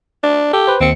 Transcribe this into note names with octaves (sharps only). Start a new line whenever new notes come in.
D4
G4 A4
B4 C5
D#2 C4 C#7